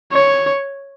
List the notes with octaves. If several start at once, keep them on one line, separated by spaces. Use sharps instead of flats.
C#5